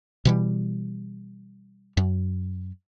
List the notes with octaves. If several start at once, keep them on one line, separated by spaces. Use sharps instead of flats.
B2 E3 G3
F#2